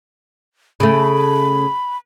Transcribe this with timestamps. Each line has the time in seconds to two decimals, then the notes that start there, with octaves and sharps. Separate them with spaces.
0.80 C#3 A3 B5